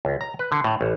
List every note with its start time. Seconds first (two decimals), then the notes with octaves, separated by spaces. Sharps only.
0.05 C#2
0.21 A#5
0.39 B4
0.52 D3
0.64 A2
0.81 A1